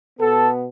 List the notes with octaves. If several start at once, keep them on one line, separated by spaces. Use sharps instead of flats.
B2 B3 A4